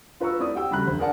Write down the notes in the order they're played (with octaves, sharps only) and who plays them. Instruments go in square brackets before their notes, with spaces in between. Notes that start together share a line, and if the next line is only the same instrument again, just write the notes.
[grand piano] F4 B4 A#5 C#6 E6
A3 C4 E4 D5 D#6
F#4 G4 G5 E6
C#3 G3 A3 A#5 B5 F#6
F1 D2 C5
D4 G#4 A#4 D5 F#5 A5